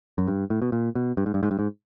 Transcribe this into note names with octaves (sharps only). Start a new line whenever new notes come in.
F#2
G2
A2
B2
A#2
B2
G2
G#2
G2
G#2
G2
G#2